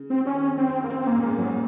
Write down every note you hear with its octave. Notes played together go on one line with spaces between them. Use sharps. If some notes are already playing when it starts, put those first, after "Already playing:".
Already playing: C#3
C4
D#3 C#4
F2
C4
F#2
F#2 A#3
F2 C4
C4
F#2 A#3
A#2
G#2 A#3
A#2 F#3